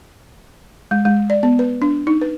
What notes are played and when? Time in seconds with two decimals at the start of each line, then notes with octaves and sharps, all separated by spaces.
0.91 G#3
1.05 G#3
1.30 D5
1.43 B3
1.59 B4
1.82 D4
2.07 D#4
2.21 B4